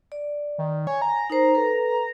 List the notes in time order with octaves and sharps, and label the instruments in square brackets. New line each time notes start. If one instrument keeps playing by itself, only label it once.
[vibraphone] D5
[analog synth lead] D#3
[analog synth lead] C#5 [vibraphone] G#5
[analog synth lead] A#5
[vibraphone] D#4 A#4 C5
A4 B4